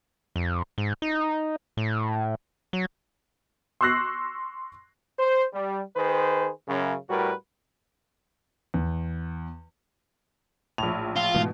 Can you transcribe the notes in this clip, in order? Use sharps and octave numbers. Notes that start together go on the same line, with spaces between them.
F2
G#2
D#4
A2
F#3
C6 C#6 E6 F#6 A#6 C7
C5
G3
D#3 G#4 B4 C5
F#2 C#3
A2 G3 F#4 A#4 B4
E2
A#1 A2 F7
F4
G#2 B2 E3 A3